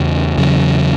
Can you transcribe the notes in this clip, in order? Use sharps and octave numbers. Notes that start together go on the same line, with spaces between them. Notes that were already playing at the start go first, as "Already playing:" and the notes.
Already playing: E2 C#3
E2 C#3 F#3